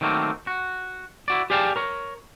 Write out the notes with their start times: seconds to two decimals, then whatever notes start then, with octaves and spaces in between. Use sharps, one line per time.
0.01 D#3 F#3 A3 A#3 C4
0.47 F#4
1.28 E4 F#4 D5
1.50 G4 G#4 D5 F5 G5 A5
1.76 A#4 C#5